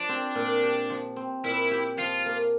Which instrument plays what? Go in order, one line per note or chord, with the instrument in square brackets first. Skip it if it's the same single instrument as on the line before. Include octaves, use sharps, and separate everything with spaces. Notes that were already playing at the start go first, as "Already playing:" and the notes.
Already playing: [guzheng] F3 [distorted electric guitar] D4
[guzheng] C4
A#2
G4
F3
C4
[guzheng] A#2 [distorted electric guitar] E4
[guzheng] G4
[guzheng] F3 [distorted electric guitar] F4
[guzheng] A#3